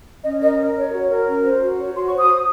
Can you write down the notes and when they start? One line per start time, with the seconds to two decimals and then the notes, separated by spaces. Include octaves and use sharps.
0.24 C#4 D#5
0.42 A#4 D#5
0.59 A#4
0.76 C#5
0.93 F#4
1.10 A#4
1.27 C#4
1.44 C5
1.61 F#4
1.78 C#5
1.94 F#4 C6
2.06 C#6
2.12 C5
2.18 D#6
2.29 C5